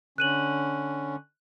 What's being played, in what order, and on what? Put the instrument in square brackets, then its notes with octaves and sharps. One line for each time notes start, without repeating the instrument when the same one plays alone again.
[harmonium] D3 C#4 [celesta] F#6 D#7 F#7